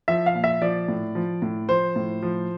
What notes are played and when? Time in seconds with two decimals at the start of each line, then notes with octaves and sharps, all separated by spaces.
0.08 F3 E5
0.26 F5
0.35 A#2
0.44 E5
0.62 F3 D5
0.88 A2
1.15 F3
1.42 A2
1.69 F3 C5
1.96 A2
2.22 F3